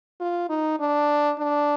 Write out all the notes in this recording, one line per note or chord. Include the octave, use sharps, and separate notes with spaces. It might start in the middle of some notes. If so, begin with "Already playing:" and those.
F4
D#4
D4
D4